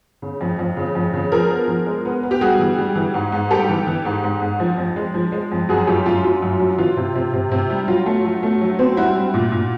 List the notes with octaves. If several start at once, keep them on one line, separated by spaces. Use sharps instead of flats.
C#3
F2
F2
C#3
F2
C#3
F3 G#4 A#4
B3
F3
G#3
B3
B3
G4
G3 F#4 G#4
E3
G3
E3
G#2
G#2
G3 G4 A4
E3
E3
G#2
G#2
G#2
F3
F2
G#3
F3
G#3
F2
F#2 F#4 G#4
F#2 F4 G4
F#2 F4
F#3 F4
F#2
F#3
E3 F4
C3
C3
C3
C3
G3
F#3 F4
A3
F#3
A3
F#3
C4
G3 E4 F#4
G3
A#2
A#2